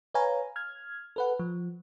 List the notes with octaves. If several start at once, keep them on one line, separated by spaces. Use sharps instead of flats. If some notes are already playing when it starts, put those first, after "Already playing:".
B4 C#5 F5 G#5 A#5
F6 G#6
A4 B4 F#5
F3